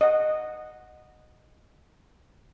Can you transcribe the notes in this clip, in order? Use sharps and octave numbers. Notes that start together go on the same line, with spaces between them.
D#5 F#5